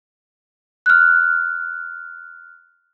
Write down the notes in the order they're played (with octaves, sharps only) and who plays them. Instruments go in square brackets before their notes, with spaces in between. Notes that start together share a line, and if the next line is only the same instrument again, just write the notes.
[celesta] F6 F#6